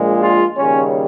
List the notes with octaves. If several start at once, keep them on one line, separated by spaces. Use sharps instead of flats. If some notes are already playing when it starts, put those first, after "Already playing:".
Already playing: A#1 A#2 G#3
F4
D#2 C#3 G3 C#4